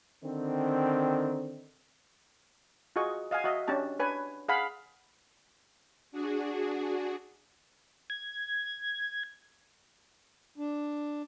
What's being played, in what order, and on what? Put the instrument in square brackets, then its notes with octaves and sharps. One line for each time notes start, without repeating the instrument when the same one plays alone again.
[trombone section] D3 D#3 C4
[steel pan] F4 F#4 G#4 D#5 C#6
D#5 F5 F#5 G#5
F#4 D#5 E5
C#4 D4 G4 A5
D4 B4 C#5 G#5
G#4 F5 F#5 B5
[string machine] D4 F#4 G#4
[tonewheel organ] G#6
[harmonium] D4